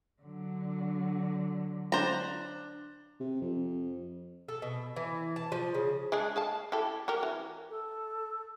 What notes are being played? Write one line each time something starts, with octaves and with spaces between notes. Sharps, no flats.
D3 F#3
D4 C5 A#5
C3
F2
A4
B2
E3
A5
F3
C#3
G#3 D4 G#4
G#4 F5 A5
E4 G4 A4
F#4 G4 A#4
E3
A4